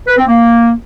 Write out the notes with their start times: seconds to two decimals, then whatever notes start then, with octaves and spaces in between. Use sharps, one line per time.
0.07 B4
0.18 C4
0.28 A#3